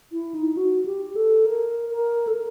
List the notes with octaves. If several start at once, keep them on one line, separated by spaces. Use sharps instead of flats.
E4
D#4
F#4
G4
A4
A#4
A#4
A4
A#4